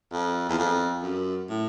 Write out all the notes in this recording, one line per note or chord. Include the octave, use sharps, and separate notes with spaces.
F2
E2
F2
F#2
A2